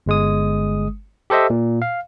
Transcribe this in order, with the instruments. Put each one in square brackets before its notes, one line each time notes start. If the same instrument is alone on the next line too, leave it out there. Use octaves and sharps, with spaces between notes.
[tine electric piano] G1 G#3 D#6
G4 A4 C5 D#5 E5
A#2
F5